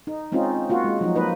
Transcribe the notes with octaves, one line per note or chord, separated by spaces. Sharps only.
D#4
G#3 C4 C#4 D#4 F4
A#3 F4 F#4
G#3
F3 F#3 D#4
A#3 D#4 B4 D#5